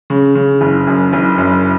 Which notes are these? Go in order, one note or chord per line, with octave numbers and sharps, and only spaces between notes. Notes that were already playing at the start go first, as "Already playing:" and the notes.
C#3
C#3
F#1
F#2
F#1
F#2